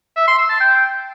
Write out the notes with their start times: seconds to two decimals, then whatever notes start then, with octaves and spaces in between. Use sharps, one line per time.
0.16 E5
0.27 C6
0.38 E6
0.49 A5
0.60 G5